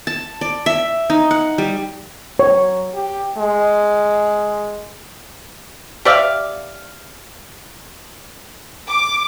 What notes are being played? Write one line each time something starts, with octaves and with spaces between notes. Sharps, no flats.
A5
D5
E5
D#4
F#5
G3
F#3 C#5
G4
G#3
G4 D5 E5 F5
D6